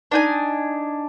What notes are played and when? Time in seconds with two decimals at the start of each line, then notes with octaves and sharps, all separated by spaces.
0.11 D4 D#4 G#5